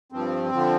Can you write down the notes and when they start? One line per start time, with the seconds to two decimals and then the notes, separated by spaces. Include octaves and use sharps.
0.12 G2 F3 C4
0.52 D3 F3